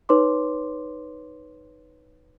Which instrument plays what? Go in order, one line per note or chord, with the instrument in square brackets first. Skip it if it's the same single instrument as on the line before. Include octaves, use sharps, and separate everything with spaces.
[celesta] D#4 B4 C#5 C6 D6